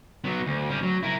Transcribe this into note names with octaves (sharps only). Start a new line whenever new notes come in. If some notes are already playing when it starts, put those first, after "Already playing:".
F#3 B3
D2
G3 C#4
F#3
E4 A#4